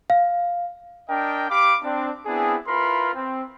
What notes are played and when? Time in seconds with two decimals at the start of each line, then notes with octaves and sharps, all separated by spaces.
0.10 F5
1.09 D4 A#4 D#5 G5
1.50 G4 F5 B5 D6
1.83 C4 D4
2.26 B3 C4 D4 E4 G#4
2.67 E4 F4 A#4 B4 B5 C6
3.14 C4